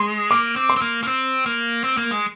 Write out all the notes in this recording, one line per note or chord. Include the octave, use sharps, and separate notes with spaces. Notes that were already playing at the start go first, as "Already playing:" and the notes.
Already playing: G#3 C6
A#3 D6
C4
C6
C4
A#3
A#3
C4
A#3
C4
A#3
G#3